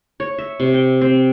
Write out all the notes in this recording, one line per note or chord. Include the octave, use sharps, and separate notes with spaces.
C#5
E5
C3
G5
C4